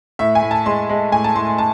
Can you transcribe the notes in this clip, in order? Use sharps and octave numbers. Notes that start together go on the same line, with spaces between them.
A2 E5
G#5
A2
A5
G#3 C6
G#3
A2 G#5
A5
A2 C6
C6
A5